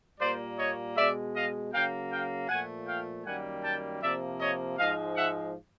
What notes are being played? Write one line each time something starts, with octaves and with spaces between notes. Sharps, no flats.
A#2 G3 A#3 C5 D5
C#5 D#5
B2 G#3 D5 E5
D#5 F5
C#3 F#3 A#3 F5 G5
F5 G5
A#2 F3 A3 F#5 G#5
F5 G5
F#2 D#3 G3 A#3 F#5 G#5
G5 A5
C3 F3 A#3 D5 E5
C#5 D#5
G#2 F3 G#3 D#5 F5
E5 F#5